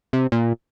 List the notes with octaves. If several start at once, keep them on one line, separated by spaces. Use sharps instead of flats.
C3
A#2